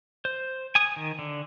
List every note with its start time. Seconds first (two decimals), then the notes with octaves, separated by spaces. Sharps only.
0.25 C5
0.75 G#5 D#6
0.96 D#3
1.19 D3